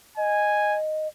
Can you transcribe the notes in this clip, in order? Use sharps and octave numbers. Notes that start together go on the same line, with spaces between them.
D#5 G#5